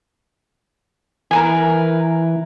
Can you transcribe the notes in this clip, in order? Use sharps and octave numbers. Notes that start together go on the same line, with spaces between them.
E3 A#4 B4 G#5